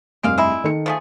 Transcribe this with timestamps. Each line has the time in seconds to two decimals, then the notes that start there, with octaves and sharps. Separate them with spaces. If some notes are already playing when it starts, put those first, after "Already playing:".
0.23 F1 G2 G#3 A#3 F5 D7
0.38 G#3 E4
0.64 D#3 A4 C#7
0.86 F3 A3 G#4